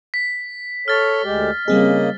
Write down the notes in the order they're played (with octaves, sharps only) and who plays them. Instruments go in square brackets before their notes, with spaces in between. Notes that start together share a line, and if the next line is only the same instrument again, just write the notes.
[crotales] B6
[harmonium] A4 C#5 [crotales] F6 A6
[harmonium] D2 G#3 G4
[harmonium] C#3 A#3 D#5 [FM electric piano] G3 C4 G#4